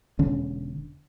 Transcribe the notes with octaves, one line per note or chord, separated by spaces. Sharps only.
E1 D3 C#4